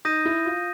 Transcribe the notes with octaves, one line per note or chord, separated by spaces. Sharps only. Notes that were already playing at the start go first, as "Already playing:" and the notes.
D#4 D#6 G6 A#6 D#7
E4
F4